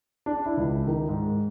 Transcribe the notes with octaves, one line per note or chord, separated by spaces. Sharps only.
D4
E4
C#2
D#3
G#2